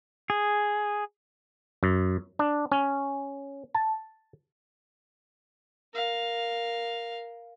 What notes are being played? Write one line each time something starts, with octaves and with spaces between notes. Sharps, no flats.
G#4
F#2
D4
C#4
A5
A#4 F5